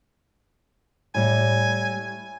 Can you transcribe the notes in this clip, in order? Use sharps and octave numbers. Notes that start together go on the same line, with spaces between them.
A2 G3 G#5